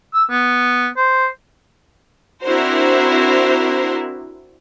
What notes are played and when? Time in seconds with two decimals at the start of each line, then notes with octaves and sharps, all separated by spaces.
0.14 E6
0.30 B3
0.97 C5
2.44 C4 D4 E4 F#4 A#4 C5